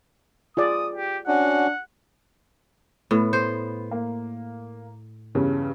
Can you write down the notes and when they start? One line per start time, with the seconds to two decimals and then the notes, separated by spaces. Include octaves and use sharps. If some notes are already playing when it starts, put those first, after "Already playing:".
0.57 F4 G#4 D5 D#6
0.95 G4
1.28 C#4 D4 F#4 F#5
3.11 A2 B3
3.33 C5
3.91 A#3
5.35 E2 G2 C#3